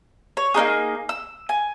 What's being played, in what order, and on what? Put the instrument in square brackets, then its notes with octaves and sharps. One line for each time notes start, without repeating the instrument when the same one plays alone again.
[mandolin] C#5
A#3 D4 D#4 G#4
E6
G#5